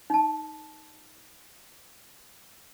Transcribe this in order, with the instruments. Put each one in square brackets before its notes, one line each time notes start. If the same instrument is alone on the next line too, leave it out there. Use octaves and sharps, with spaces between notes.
[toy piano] D#4 A5